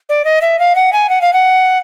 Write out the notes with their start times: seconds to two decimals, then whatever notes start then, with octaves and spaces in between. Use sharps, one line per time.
0.09 D5
0.25 D#5
0.42 E5
0.59 F5
0.75 F#5
0.93 G#5
1.09 F#5
1.21 F5
1.33 F#5